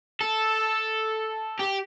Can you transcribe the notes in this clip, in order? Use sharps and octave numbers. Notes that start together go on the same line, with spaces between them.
A4
G4